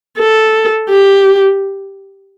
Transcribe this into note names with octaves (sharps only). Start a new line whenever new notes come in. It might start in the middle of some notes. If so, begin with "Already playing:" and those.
A4
G4